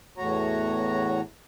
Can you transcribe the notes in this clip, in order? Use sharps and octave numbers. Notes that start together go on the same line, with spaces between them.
E2 A2 F#4 C#5 A#5